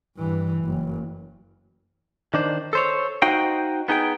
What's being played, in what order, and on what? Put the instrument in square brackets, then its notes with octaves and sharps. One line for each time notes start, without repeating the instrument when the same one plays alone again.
[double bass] G2 E3
F#1
[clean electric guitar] D#3 D4 C5
A4 C5 C#5
D#4 F#4 C5 D#5 F5 G5
B3 D#4 G#4 G5